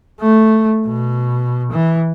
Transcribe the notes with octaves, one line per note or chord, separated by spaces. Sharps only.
A3
B2
E3